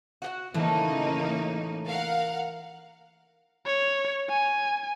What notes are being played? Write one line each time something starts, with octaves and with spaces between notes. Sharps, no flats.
F#4 G4 F#5
A2 C#3 E3 A3 A#3 D#4
A#4 F5 F#5
C#5
G#5